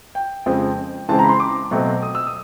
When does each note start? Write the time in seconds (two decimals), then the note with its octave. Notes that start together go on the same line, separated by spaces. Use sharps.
0.15 G5
0.46 F2 C#3 F3 G#3 C4
1.09 C#3 E3 G#3 C4 A5
1.19 A#5
1.24 B5
1.29 C6
1.40 D6
1.71 B2 F#3 A3 C4
2.02 D#6
2.15 E6
2.27 D#6